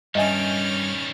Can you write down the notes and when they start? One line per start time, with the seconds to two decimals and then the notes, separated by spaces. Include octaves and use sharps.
0.15 G2 D#3 G3 C#4 D#5 E5 G#5 F6